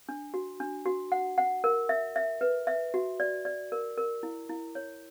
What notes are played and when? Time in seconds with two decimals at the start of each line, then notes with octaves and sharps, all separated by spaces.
0.09 D4
0.34 F#4
0.60 D4
0.86 F#4
1.12 F#5
1.38 F#5
1.64 A#4
1.89 E5
2.16 E5
2.41 B4
2.67 E5
2.94 F#4
3.20 D5
3.45 D5
3.72 A#4
3.98 A#4
4.23 E4
4.49 E4
4.75 C#5